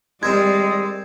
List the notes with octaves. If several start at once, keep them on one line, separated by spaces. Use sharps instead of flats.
G3 G#3 C4 A#4 D5 G#6